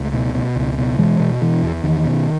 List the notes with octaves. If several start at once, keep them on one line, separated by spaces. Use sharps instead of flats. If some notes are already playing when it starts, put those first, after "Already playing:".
Already playing: C#2 A3
B2
B2
C#2
B2
B2 E3 G#3
B2
B2 E3
E2
E2 D#3
B2